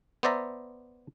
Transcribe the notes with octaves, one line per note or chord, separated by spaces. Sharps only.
B3 C5 D5 E5 A#5